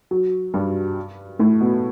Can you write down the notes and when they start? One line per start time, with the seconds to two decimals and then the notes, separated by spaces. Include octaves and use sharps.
0.11 F#3
0.54 G2 G3
1.39 A2 A3
1.61 B2 B3